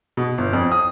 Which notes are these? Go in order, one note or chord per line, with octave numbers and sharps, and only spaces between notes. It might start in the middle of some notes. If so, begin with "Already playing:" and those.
B2
G1
F2
D#6